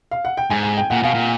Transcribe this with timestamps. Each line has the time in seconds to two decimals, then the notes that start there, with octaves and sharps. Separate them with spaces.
0.11 F5
0.25 F#5
0.37 G5
0.50 G#2 G#5
0.63 G#5
0.77 G5
0.90 A#2 F#5
1.03 B2 F5
1.14 A#2